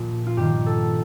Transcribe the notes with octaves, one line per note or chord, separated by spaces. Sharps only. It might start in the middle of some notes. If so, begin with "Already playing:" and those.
Already playing: A#2 F3 F4
F4
G2 D#3 G4
A4